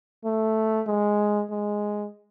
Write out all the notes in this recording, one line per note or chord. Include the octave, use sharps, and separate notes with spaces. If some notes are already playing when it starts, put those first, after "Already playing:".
A3
G#3
G#3